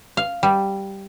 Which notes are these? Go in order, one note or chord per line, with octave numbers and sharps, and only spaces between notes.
F5
G3